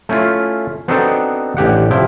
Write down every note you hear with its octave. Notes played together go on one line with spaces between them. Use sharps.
A3 C#4 E4 F4
B3 C4 D4 D#4 F#4 A4
A1 D3 G4 F#5
C3 F3 E4 G5